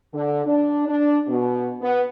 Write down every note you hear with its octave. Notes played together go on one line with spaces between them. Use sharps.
D3
D4
D4
B2
B3